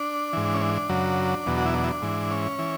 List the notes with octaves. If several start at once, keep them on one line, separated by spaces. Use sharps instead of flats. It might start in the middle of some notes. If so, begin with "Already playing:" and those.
Already playing: D4
G#2 E3
C#4
D4
F#2 C#3 F#3
E2 B2 F#3
F#4
E4
D4
E4
D4
G#2 E3
C#4
E3